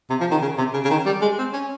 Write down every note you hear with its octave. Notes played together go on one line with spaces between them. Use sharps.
C3
F3
D#3
C#3
C3
C#3
C#3
D#3
G3
G#3
C4
C#4